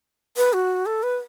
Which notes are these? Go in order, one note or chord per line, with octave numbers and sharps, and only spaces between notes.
B4
F#4
A4
B4